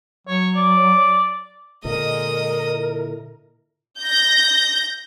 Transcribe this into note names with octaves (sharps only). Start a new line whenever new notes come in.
F#3 C#5
D5
A#2 D3 G#3 A#4 D#5 D#6
E4
G6 A#6